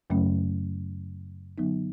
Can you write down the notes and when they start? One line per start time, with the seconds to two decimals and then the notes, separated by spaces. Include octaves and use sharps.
0.10 F#2 C#3 F#3 A3 C#4
1.58 D3 F#3 B3 D#4